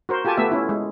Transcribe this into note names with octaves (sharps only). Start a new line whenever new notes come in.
F#4 A#4 C5
F4 G4 A4 G#5 A5
A3 B3 G4 E5
C#4 E4
G#3